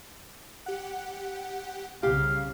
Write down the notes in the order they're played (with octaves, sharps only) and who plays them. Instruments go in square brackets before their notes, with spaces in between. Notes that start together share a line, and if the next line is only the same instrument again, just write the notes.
[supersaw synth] G4 F#5
[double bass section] C2 C#3 [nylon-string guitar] G4 [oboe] F5